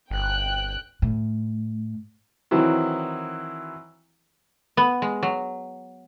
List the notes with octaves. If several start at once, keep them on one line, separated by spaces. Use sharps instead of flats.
G1 G5 F#6
A2
D#3 E3 F#3 C4 E4
B3
G#3
F#3